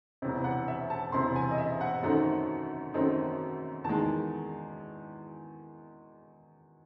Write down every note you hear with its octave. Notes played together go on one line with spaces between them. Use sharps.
E1 E2 C3
F#5
E5
A5
E1 E2 C3 C6
G#5
D#5
E5
F#5
F#2 D#3 A3 C4 D#4 F#5
F#2 D#3 A3 C4 D#4
E2 D#3 G#3 A5